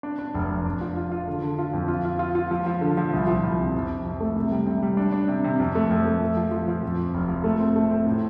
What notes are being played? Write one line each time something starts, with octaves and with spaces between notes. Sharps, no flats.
D4
D4
F1
F1
D4
F3
F4
F4
D3
D3
F4
F2
F4
F4
F4
F4
F3
F3
D3
F3
C2
F3
C2
C3
F2
C3
F2
A3
C3
G3
C3
G3
D4
D4
C3
C3
F2
A3
F2
A3
F2
F3
F3
F3
F2
F2
F1
F3
A3
C4
A3
C4
A2